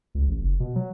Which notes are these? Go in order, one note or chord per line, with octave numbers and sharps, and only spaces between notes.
C#2
A1
F#1
B2
F#3